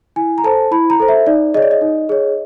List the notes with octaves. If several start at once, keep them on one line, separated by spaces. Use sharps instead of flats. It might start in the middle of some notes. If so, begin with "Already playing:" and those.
E4 G#5
A#5
A4 C5 A5
E4 B5
A#5
A4 C5
E5
D#4 D5
G#4 C#5 D#5
D5
D#5
D#4
G#4 C#5